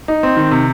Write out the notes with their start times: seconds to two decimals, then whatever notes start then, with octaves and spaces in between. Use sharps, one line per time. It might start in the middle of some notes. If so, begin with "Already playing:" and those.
0.08 D#4
0.23 C4
0.37 D#3
0.51 C3